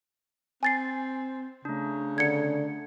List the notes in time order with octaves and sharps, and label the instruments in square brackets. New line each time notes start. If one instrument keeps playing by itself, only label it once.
[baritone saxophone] C4 [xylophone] G#5 A6 C7
[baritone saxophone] C#3 [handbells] A3 D4
[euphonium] D3 [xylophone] G#6 C#7